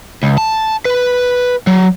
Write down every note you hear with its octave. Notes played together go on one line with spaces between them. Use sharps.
C#2
A5
B4
F#3